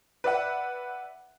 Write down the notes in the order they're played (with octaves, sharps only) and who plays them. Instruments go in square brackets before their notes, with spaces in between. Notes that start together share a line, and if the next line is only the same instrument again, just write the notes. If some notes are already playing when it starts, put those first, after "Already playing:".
[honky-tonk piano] B4 D5 E5 F#5